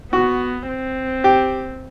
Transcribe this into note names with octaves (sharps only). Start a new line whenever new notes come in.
B3 F#4
C4
G4